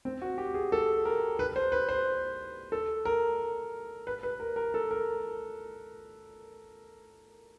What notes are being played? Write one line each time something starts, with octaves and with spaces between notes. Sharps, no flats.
C4
F#4
G4
G#4
A4
A#4
B4
C5
B4
C5
A4
A#4
B4
B4
A#4
A#4
A4
A#4